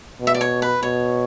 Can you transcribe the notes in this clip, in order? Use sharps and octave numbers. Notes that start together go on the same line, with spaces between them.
B2
E5
D5
C#5
B4
B2 C#5